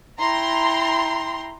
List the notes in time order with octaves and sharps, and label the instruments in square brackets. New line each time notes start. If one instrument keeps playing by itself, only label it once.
[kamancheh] E4 G5 [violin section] A#5 C6